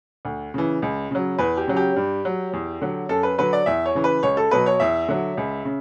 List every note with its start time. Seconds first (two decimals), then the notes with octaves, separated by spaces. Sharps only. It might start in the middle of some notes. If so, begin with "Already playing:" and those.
0.25 D2
0.54 C#3 E3
0.82 C#2
1.11 C#3 F#3
1.39 E2 B4
1.57 G4
1.68 C#3 F#3
1.77 G4
1.96 G2
2.25 F#3
2.53 E2
2.82 D3 F#3
3.09 F#2 A4
3.23 B4
3.38 D3 F#3 B4
3.53 D5
3.66 E2 E5
3.86 C#5
3.95 C#3 E3
4.04 B4
4.23 C#2 C#5
4.37 A4
4.51 B2 F#3 B4
4.66 C#5
4.80 E2 E5
5.09 D3 F#3
5.37 C#2
5.65 C#3